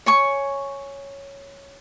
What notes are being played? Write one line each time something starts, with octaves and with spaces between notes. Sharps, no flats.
C#5 G#5 C#6